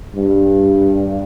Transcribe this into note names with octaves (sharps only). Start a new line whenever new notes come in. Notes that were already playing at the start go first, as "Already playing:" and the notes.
G2